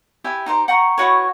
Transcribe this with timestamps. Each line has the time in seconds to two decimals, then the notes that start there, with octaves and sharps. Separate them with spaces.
0.24 E4 G4 E5 G#5
0.46 D#4 G4 C5 A#5
0.68 F#5 G5 A#5 C#6
0.98 E4 F#4 B4 C#5